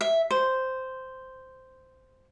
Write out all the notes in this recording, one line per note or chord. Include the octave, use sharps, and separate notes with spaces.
E5
C5